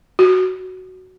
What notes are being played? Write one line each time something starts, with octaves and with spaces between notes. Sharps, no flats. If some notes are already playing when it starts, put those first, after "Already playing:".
F#4